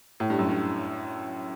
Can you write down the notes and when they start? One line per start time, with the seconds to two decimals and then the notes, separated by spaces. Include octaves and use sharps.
0.20 A2
0.30 G2
0.39 F#2
0.49 G2